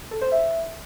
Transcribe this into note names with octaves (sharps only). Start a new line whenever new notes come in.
A4
C5
E5